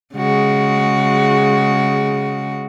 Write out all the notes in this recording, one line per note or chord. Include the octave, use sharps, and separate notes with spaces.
C#3 G#3 F#4